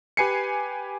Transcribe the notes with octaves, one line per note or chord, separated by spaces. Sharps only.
G4 B4 G#5 C7 C#7